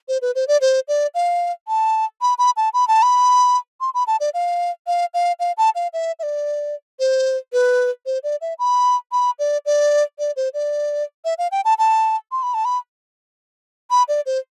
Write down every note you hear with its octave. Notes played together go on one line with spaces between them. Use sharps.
C5
B4
C5
D5
C5
D5
F5
A5
B5
B5
A5
B5
A5
B5
C6
B5
A5
D5
F5
F5
F5
F5
A5
F5
E5
E5
D5
C5
B4
C5
D5
E5
B5
B5
D5
D5
D5
C5
D5
E5
F5
G5
A5
A5
C6
B5
A5
B5
B5
D5
C5